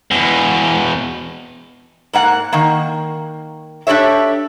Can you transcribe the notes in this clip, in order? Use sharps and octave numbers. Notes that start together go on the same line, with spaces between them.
E2 B2
G#2 A#3 F#5
D#3 A#3
D4 G4 A4 C#5 E5